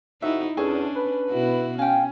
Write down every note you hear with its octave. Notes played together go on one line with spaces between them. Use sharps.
F2 D#4 E4 F#4 E5
E2 C#4 D4 G#4 A4 C#5
B4
B2 E4 F#4
C#4 F5 G5 G#5